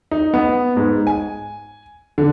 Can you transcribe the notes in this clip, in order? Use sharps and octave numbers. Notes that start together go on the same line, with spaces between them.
D#4
B3
G#2
G#5
D3